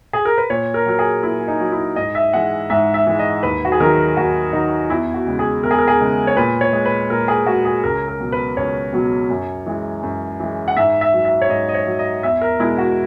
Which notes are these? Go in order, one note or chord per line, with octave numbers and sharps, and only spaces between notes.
G#4
A#4
B4
A#2 C#5
A#4
F#3 A#4
G#4
A#2 E4
D#4
F#3
E4
G#2 D#5
E5
E3 G#3 F#5
G#2 E5
E5
E3 G#3
D#5
D#2 B4
F#4
G#4
D#3 F#3 A#4
D#2 F#4
D#3 F#3 D#4
E2 E4
F#4
C#3 G#3
G#4
E2 A#4
G#4
A#4
G#4
C#3 G#3
C#5
A#2 B4
C#5
G#3
B4
A#2 A#4
G#4
G#3 F#4
G#4
C#2 A#4
A#4
B2 F#3
B4
C#2 C#5
B2 F#3
F#2
E3 G#3
F#2
E3 G#3
F#5
G#2 E5
E5
F#3
E5
C#5
G#2 D#5
D#5
C#5
F#3
D#5
E2 E5
A#4
B2 G#3 E4
F#4